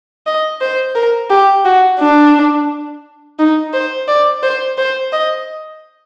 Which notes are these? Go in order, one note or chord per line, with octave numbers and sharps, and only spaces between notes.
D#5
C5
A#4
G4
F#4
D4
D#4
C5
D5
C5
C5
D#5